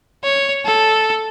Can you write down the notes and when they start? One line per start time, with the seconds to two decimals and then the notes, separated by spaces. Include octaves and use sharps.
0.24 C#5
0.66 A4